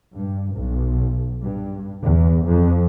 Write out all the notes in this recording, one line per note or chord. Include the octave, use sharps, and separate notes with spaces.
G2
B1
G2
E2
F2